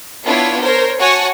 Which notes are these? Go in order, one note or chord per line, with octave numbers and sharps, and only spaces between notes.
B3 D4 E4 F4 C#5
A#4 C5 C#5
F#4 C#5 F#5 G#5 A5 C#6